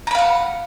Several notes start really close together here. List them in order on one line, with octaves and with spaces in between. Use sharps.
A#5 B5 F5 F#5